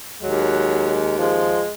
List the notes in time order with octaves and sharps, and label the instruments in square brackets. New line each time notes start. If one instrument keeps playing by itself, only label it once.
[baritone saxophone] D#2 [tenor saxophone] F#3 [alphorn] G#3
[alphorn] F3 [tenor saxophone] G#3